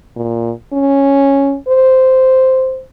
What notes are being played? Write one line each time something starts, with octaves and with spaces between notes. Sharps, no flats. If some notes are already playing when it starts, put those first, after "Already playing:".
A#2
C#4
C5